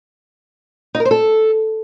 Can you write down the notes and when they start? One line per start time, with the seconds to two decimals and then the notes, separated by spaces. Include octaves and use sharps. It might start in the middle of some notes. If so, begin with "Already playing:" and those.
0.95 D#4
1.00 A#4
1.05 C5
1.11 A4